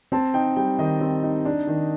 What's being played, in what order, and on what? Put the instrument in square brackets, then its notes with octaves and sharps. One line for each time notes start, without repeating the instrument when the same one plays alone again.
[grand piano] C4 A5
D#4 G5
G3 G5
D#3 D#5
C4
D#4
D4
D#3